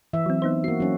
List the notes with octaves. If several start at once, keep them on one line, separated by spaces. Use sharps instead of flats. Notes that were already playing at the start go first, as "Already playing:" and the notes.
E3 E5
F#3 C4
B3 D#4 C5
A#3 F#4 C7
F#3 C#4